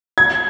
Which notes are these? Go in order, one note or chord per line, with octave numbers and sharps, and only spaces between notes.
G#6